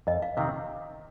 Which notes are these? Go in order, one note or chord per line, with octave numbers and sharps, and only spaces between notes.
F2 D#5
F5
C3 D#3 C4 F5